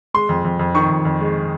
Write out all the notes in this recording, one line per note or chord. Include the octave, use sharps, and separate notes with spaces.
G#3 C6
F2
F2
F2
D#3 C#6
F2
F2
G#3